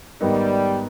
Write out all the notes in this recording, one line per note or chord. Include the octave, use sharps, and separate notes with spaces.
G#2 D#3 G3 B3 D#4